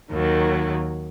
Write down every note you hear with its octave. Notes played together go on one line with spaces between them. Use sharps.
D#2 D#3 F#3